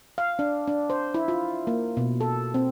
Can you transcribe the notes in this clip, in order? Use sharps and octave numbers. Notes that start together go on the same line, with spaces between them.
F5
D4
D4
C5
E4
F4
A#3
B2
A4
C4